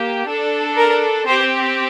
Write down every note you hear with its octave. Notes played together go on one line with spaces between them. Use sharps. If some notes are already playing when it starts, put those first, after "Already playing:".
Already playing: A#3 G4
D4 A4
A#4
C4 G4 C5